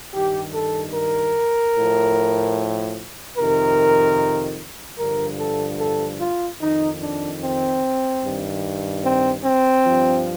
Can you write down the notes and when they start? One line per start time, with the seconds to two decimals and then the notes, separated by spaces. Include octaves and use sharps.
0.14 G2 D#3 G4
0.54 A4
0.94 A#4
1.75 A2
1.80 F3
3.37 F2 C3 D#3 A#4
4.99 G2 D3 F3 A#4
5.39 A4
5.79 A4
6.20 F4
6.61 F2 D#3 D#4
7.02 D4
7.41 C4
8.23 G2 D#3
9.04 C4
9.44 C4
9.85 G2 F3